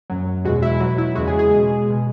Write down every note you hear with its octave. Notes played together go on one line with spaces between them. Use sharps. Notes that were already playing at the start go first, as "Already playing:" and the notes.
F#2 F#3
E2 B2 G#3 F#4
E4
B2 F#3 F#4
E4
E2 C#3 G#3 F#4
G#4
G#4
B2 G#3
B2 G#3